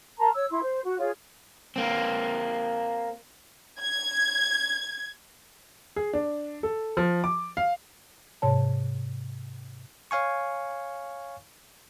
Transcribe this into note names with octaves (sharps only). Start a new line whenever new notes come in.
A#4 A5 A#5 C6
C#5 E6
E4 C6
C5
F#4
F4 G#4 C#5
A#3 C4
G#6
G#4
D4
A4
F3
D6
F5
G#2 C3 C#5 A5
C#5 F5 G#5 C#6